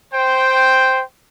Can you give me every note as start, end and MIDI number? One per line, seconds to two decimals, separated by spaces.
0.14 1.01 72
0.14 1.01 79